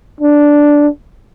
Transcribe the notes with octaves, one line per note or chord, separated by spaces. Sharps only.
D4